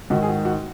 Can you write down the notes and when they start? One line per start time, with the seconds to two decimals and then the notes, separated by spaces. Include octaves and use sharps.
0.10 G#2 D#3 F#4
0.23 G#4
0.28 F#4
0.45 F#4